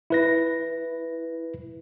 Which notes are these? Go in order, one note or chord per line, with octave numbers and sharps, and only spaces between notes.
E4 B4 A#6